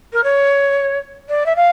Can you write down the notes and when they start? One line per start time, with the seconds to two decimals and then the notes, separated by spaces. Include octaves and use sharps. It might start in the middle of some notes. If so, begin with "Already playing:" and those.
0.13 A#4
0.24 C#5
1.29 D5
1.46 E5
1.56 F5